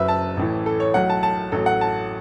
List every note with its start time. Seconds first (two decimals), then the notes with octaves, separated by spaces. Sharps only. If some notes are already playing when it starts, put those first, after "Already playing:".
Already playing: F#1 F#2 F#3 B4 E5
0.08 A5
0.37 A1 A2 E3
0.66 A4
0.80 C#5
0.94 B1 A2 F#3 F#5
1.10 A5
1.23 A5
1.52 A1 A2 F#3 A4
1.66 F#5
1.81 A5